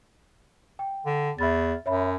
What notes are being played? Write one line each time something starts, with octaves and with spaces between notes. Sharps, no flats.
G5
D3
E2 E5 B5 A6
F#2 C#5 E5 B5